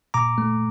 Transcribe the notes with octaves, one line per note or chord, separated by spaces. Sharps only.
A#2 A#5 D6
A3